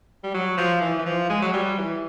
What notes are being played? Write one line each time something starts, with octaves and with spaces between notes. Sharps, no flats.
G3
F#3
F3
E3
E3
F3
G#3
F#3
G3
E3